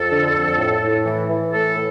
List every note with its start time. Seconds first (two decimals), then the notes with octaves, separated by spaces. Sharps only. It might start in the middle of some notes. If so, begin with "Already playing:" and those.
Already playing: F2 A4
0.11 D3
0.34 F2
0.58 A2
0.81 A2
1.05 E3
1.29 E3
1.52 A2 A4
1.75 A2